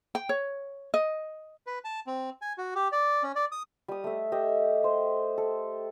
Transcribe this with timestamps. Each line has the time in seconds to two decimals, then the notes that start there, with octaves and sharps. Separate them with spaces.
0.15 G5
0.29 C#5
0.94 D#5
1.67 B4
1.84 A5
2.07 C4
2.41 G#5
2.58 F#4
2.75 G4
2.92 D5
3.23 C#4
3.36 D5
3.52 D#6
3.88 G3 D#6
4.04 A3 E5
4.32 G4 D#5 E5
4.84 C5
5.38 A4